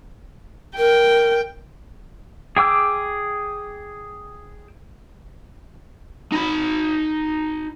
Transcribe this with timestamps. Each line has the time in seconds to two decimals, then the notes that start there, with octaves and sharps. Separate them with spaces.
0.77 A#4 G5
2.57 G#4 G5 D6 E6
6.32 D#4 B5